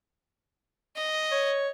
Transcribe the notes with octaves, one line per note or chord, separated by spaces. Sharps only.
D#5
C#5